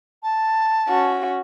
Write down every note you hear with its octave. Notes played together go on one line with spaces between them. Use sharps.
A5
C#4 F#4